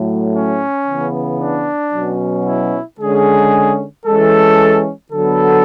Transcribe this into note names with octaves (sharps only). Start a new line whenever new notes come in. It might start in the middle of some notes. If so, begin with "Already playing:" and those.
Already playing: A2 F#3 A3
C#4
C#3 E3 B3
D4
B2 F#3 C#4
E4
D3 G#3 C#4 G#4
E3 G#3 C#4 A4
D3 F#3 B3 A4